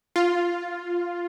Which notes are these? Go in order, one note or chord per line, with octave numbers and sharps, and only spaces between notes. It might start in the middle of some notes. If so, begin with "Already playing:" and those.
F4